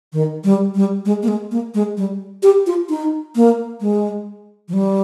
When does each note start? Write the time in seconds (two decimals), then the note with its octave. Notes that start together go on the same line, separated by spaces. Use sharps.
0.13 D#3
0.44 G3
0.75 G3
1.05 G#3
1.23 A#3
1.28 G#3
1.52 A#3
1.74 G#3
1.97 G3
2.43 G4
2.67 F4
2.89 D#4
3.36 A#3
3.81 G#3
4.68 F3
4.73 G3